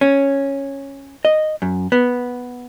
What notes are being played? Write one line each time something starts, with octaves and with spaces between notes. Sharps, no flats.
C#4
D#5
F#2
B3